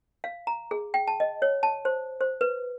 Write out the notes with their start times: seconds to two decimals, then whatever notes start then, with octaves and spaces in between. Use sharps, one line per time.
0.24 F5
0.47 A#5
0.71 G#4
0.94 G5
1.08 A5
1.20 D#5
1.42 C#5
1.63 A5
1.85 C5
2.21 C5
2.41 B4